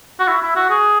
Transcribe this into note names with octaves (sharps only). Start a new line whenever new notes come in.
F#4
E4
E4
F#4
G#4